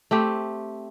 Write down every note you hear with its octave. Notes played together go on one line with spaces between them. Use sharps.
A3 C4 G4